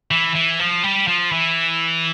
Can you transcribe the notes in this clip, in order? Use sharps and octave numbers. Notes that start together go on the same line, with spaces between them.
E3
E3
F3
G3
F3
E3